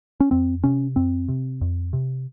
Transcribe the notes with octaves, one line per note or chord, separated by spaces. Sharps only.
C#4
F2 C4
C3 C#4
F2 C4
C3
F2
C3